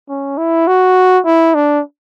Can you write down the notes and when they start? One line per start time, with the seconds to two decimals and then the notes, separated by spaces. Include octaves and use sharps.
0.09 C#4
0.38 E4
0.67 F#4
1.25 E4
1.55 D4